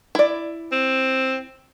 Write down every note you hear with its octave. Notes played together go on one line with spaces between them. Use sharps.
E4 D5
C4